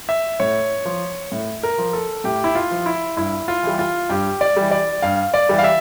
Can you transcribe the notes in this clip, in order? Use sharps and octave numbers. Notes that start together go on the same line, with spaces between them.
E5
A2 C#5
F3
A2
A#4
F3
A4
A2 G4
E4
F4
F3
E4
G2 E4
F4
E3 G3
F4
G2 G4
D5
E3 G3
D5
G2 F5
D5
E3 G3
F5
E5